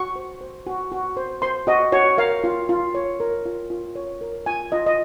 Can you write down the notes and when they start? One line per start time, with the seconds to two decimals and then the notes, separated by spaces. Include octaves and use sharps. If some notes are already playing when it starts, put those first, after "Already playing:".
Already playing: F#4 C#6
0.16 C5
0.41 C5
0.67 F#4
0.92 F#4
1.17 C5
1.42 C5 C6
1.67 F#4 D#5
1.92 F#4 C#5
2.18 A#4 F5
2.44 F4
2.69 F4
2.95 C#5
3.20 A#4
3.46 F4
3.70 F4
3.96 C#5
4.21 A#4
4.46 F4 G#5
4.72 F4 D#5
4.86 D#5